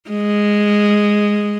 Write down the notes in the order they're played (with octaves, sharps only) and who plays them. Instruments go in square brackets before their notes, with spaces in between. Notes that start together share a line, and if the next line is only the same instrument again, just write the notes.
[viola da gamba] G#3